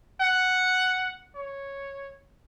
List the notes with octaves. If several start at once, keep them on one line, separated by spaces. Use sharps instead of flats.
F#5
C#5